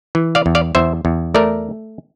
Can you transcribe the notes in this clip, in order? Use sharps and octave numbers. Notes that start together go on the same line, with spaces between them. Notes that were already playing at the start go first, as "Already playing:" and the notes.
E3
D5 F5
E2
D5 F5
E2 C5 E5
E2
A3 A#4 D5